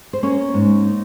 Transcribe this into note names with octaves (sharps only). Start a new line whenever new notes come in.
C5
A#3 C#4 C#5
G#2
D#4